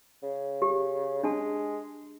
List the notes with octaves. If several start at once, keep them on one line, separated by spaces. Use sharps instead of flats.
C#3
G4
G#3 D4 G#5 A5